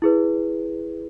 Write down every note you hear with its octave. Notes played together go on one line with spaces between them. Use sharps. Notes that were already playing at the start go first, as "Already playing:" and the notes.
E4 G#4 B4